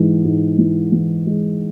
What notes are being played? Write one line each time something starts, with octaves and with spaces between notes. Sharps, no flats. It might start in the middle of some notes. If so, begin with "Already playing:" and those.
Already playing: G#2 E3 G#3
G#2
E3
E3
G#3